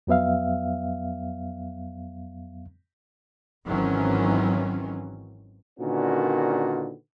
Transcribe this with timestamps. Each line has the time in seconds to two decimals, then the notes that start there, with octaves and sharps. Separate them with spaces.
0.07 F2 F#3 B3 E5 F5
3.66 G#1 D#3 E3 F#3 C4 C#4
5.80 A#2 D3 D#3 C#4 F#4 B4